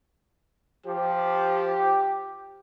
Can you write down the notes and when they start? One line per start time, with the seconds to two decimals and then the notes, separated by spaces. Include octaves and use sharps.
0.87 F3 G4